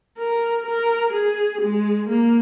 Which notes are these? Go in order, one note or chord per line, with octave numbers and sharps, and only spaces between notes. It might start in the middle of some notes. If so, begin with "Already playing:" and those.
A#4
A#4
G#4
G#3
A#3